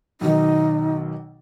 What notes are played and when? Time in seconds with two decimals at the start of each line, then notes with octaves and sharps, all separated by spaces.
0.21 B1 B2 D#3 D#4